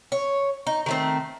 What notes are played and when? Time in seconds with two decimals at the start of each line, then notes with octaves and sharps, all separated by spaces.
0.12 C#5
0.67 D#4
0.86 D#3 A3 C4